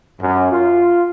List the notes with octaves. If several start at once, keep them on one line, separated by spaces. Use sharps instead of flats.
F#2
F4